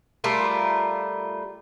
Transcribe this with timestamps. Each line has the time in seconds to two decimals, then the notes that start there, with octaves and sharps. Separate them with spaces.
0.24 G3 A3 F4 A#4